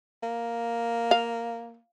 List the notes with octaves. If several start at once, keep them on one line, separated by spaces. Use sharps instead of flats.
A#3
F5